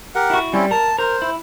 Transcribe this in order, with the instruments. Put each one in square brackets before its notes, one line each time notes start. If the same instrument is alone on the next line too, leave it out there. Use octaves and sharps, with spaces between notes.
[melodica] G4 A#4 F#5
[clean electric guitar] E4 F#4
[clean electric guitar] G3 [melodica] C4 C#4 E4
[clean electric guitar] A#4 [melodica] A5
[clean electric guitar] A#4 [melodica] C5
[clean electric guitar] E4